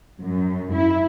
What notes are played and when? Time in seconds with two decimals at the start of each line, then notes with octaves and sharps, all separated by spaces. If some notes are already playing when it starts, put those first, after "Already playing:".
0.21 F#2
0.73 E4